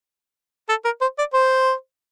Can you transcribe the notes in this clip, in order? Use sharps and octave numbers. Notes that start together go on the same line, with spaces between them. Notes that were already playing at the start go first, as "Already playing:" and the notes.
A4
A#4
C5
D5
C5